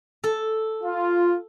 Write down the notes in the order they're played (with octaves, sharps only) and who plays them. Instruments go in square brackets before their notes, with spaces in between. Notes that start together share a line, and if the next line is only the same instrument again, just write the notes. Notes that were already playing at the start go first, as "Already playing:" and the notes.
[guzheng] A4
[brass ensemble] F4